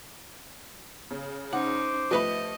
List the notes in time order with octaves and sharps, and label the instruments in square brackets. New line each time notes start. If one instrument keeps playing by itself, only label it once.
[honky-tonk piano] C#3
[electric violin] C#4 D#4 [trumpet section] C5 D6 [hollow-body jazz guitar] F#5
[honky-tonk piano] F3 A3 [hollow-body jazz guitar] G4 B4 B5 [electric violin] D#5